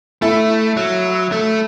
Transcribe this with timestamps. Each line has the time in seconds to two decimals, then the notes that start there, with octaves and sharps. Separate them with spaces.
0.22 A3 E4
0.77 F#3
1.32 A3